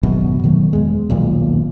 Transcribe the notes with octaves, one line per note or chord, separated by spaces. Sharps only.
G#1 F#2 B2
B2 D#3 F#3 A3
E2 G#3
D#1 B1 A#2